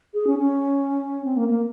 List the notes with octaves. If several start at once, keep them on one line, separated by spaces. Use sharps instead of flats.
G#4
C#4
C#4
C4
A#3
A#3